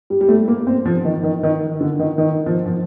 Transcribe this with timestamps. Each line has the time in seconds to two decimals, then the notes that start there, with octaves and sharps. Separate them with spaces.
0.10 G3
0.21 G3
0.29 A3
0.48 A#3
0.67 C4
0.85 F3
1.05 D#3
1.23 D#3
1.43 D#3
1.81 D3
2.00 D#3
2.18 D#3
2.46 F3
2.66 F3